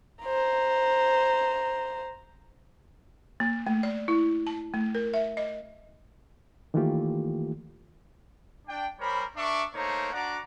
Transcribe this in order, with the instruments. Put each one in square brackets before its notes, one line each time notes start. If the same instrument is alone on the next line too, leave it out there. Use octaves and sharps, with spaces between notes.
[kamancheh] C5 A#5
[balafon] A#3
A3
D5
E4
A5
A3
A#4
E5
D#5
[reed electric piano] D#3 E3 A3 A#3 F4 G4
[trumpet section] D4 G5
G3 G#4 A#4 C5 C#5 B5
D4 A#4 E5 C#6 D6
A3 A#3 D#4 C5 C#5 A#5
D4 F#4 D5 F#5 A#5 D6